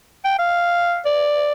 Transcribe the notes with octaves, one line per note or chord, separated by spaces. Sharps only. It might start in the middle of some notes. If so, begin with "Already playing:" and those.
G5
F5
D5